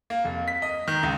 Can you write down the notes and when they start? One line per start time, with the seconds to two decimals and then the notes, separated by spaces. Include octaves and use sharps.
0.10 A#3
0.25 F1
0.48 B6
0.62 D#5
0.88 D#3
1.03 C#2